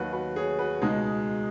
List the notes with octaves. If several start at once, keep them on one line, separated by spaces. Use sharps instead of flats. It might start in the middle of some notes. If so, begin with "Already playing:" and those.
Already playing: D#2 D#3 F#3 F#4 B4
F#4 B4
G#4 C#5
F#4 B4
C#2 B2 G#3 D#4